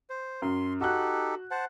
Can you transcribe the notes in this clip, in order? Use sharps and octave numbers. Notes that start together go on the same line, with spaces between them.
C5
F#2 C6
D#4 F#4 G4 A4 F#6
C5 F#5 A5